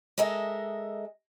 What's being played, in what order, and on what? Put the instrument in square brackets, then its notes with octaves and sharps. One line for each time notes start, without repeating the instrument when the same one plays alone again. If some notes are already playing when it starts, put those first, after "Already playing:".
[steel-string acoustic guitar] G#3 A4 A#4 D#5 E5